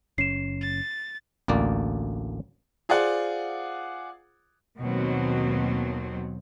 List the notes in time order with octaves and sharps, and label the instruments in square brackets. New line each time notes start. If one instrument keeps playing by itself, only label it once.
[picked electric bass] F#1 C#4 [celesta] C7 E7
[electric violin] A6
[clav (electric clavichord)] A1 D2 A#3 D5
[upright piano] F4 G#4 C5 D5 F#5
[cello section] D#2 B2 F#3 C4